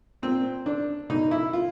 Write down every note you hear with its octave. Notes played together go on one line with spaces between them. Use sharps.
A#2 C4
D4
B2 D#4
E4
F4